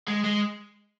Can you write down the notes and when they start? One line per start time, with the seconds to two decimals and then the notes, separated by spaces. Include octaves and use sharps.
0.08 G#3
0.25 G#3